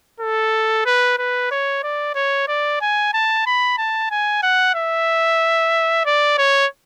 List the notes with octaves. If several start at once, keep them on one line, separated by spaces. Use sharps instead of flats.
A4
B4
B4
C#5
D5
C#5
D5
G#5
A5
B5
A5
G#5
F#5
E5
D5
C#5